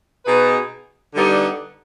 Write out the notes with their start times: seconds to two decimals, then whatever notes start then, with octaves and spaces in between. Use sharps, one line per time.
0.26 B2 B3 D#4 G#4 B4
1.15 D3 G3 B3 D#4